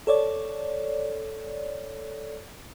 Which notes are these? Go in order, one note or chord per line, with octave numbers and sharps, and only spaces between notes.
A4 C#5 D5